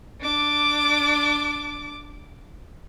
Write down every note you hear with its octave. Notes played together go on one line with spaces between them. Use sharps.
D4 D6